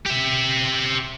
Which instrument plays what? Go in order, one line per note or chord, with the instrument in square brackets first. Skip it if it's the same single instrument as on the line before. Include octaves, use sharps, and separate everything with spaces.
[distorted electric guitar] G4 E5